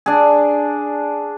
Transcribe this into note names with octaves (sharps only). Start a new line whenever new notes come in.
D4 G#4